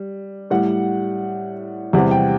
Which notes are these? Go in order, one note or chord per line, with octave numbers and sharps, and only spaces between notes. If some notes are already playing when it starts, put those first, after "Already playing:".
Already playing: G3
A2 G3 F#5
E2 C3 G3 F#5
G5